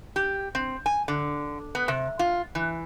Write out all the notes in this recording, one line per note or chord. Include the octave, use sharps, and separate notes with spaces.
G4
C4
G#5
D3
B3
C3
F4
E3